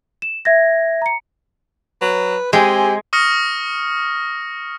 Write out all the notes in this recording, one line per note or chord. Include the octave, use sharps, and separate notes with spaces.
E7
E5 G#6 A#6
A#5 C#7
F#3 B4
G#3 C4 G4 G#5
C#6 D#6 F6 A#6 C#7